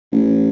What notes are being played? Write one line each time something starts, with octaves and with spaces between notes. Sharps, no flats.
A1